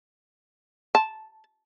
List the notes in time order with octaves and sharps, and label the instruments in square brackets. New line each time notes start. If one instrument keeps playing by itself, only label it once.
[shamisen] A5